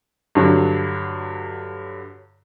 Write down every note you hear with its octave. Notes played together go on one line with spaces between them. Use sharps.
G2 D3 F#3